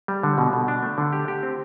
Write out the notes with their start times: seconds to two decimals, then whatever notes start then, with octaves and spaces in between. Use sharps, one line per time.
0.08 G3
0.23 D3
0.38 B2
0.53 B2
0.68 D4
0.83 A3
0.98 D3
1.13 G4
1.28 G4
1.43 C4